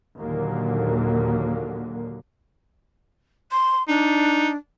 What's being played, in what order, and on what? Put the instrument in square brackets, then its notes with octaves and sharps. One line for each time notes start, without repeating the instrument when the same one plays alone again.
[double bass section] D#2 A#2 D3 F#3 A#3
[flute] C6
[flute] D4 [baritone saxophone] D#4